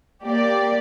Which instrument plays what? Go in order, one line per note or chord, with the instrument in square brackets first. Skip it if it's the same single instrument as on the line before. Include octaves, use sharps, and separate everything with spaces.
[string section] A#3 G4 D5